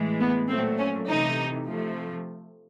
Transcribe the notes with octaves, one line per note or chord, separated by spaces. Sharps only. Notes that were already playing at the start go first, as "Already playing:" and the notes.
Already playing: A2 E3 G#3
B3
A#2 F#3 A3 C4
C#4
C3 E3 A3 D#4
C3 F3 A3